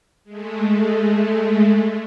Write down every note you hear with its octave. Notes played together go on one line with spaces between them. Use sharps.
G#3 A3